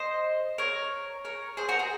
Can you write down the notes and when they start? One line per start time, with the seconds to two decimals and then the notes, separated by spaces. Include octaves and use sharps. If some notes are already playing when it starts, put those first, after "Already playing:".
Already playing: C5 D#5
0.58 A#4 C#5
1.25 A#4 C#5
1.57 G#4 C5
1.69 F#4 A#4
1.79 G#4